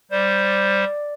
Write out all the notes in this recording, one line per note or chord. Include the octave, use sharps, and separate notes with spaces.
G3 C5 D5